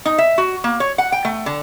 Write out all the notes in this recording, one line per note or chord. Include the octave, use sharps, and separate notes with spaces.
D#4
E5
F#4
A#3
C#5
F#5
G5
A3
D3